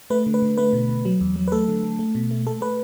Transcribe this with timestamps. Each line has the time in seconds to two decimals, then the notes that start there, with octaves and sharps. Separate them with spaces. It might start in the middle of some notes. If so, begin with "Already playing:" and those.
0.10 A3 B4
0.26 D3
0.34 B4
0.42 D3
0.57 A3 B4
0.73 B2
0.89 B2
1.05 F#3
1.21 E2
1.36 F#3
1.48 B4
1.52 A3 A4
1.68 D3
1.83 D3
1.99 A3
2.15 B2
2.31 A3
2.47 A3 A4
2.61 A3 B4